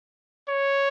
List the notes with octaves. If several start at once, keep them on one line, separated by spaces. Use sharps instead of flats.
C#5